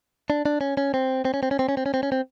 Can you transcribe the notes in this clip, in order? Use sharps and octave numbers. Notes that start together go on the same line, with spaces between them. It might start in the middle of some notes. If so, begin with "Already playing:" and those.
D4
D4
C#4
C#4
C4
C4
C#4
C4
C#4
C4
C#4
C4
C#4
C4
C#4
C4